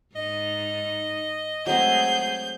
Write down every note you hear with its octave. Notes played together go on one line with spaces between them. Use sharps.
G#2 D#4 D#5
F#3 G#3 A3 C4 G#4 G6